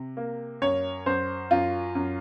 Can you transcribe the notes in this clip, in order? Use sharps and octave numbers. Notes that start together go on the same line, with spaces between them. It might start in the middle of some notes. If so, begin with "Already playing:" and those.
Already playing: C3
A#3
F#2 C#5
F#2 C5
F#2 F4
F#2